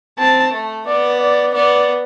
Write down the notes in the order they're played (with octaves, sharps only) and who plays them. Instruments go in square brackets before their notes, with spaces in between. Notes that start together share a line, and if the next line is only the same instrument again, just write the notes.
[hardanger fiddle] C4 [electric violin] A5
[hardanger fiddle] A3
[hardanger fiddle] B3 [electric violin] D5
[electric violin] D5
[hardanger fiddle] B3 [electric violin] D5